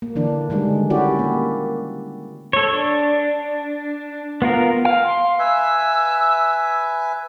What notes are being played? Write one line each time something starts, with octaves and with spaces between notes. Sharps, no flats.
A#3
D3 E3 D4
D3 D#3 G3 G#3
C#4 E4 F#4 G4 D5
A#3
A4 C#5
D4
B3 F4 A#4
F5
C6
B4 E5 G#5 E6